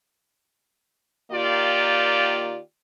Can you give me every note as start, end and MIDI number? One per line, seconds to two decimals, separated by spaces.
1.32 2.59 51
1.32 2.59 58
1.32 2.59 65
1.32 2.59 67
1.32 2.59 74